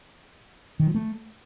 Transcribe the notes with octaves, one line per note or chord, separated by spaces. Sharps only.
D#3
F3
A3